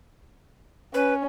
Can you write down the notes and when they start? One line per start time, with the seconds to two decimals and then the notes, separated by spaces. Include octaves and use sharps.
0.94 C#4 B4